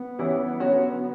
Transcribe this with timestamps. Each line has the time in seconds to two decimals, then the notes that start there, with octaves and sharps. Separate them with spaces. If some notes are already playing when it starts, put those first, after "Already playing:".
Already playing: B3
0.18 E3 G3 C#4 E4
0.60 D3 F#3 C#4 F#4